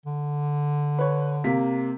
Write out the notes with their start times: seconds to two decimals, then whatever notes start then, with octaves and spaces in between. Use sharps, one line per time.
0.06 D3
0.99 B4 C#5
1.44 C3 A#3 B6